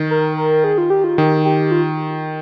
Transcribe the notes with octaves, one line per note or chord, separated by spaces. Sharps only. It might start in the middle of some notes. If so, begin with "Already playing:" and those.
Already playing: D#3
A#4
A#4
G#4
F4
G4
F4
D#3 G4
G4
F4